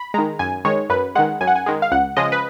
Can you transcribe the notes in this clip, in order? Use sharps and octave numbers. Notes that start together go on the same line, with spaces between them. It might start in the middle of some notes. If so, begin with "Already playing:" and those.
Already playing: B5
D#3 G#3 A#5
F#2 G#5
D#3 G#3 C#5
F#2 B4
D#3 G#3 F#5
F#2 G#5
F#5
G#5
D#3 G#3
F5
C#2 F#5
C#3 F3 G#3 D#5
B4